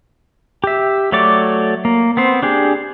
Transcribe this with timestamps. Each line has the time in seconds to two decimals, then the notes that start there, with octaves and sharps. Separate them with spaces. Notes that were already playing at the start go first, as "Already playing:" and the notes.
0.64 G4 E5
1.12 F#3 A3 C#5 D5 D6
1.85 A#3
2.17 B3 C4 C5
2.43 D4 G4 G#4